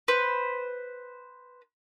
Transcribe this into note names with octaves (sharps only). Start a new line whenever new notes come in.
B4 C5